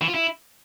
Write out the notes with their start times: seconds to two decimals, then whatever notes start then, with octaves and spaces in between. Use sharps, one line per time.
0.01 E3
0.08 F4
0.14 E4